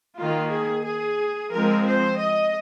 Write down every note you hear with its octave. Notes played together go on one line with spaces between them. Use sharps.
D#3 A#3 F4
G#4
G#4
F3 G#3 C4 A#4
C5
D#5